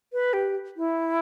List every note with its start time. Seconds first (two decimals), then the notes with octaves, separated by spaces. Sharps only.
0.13 B4
0.33 G4
0.77 E4